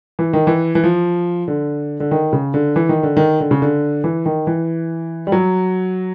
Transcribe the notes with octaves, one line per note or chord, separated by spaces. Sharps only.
E3
D#3
E3
E3
F3
D3
D3
D#3
C#3
D3
E3
D#3
D3
D#3
D3
C#3
D3
E3
D#3
E3
G3
F#3